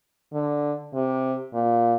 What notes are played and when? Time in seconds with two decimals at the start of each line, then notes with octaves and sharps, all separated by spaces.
0.33 D3
0.94 C3
1.54 A#2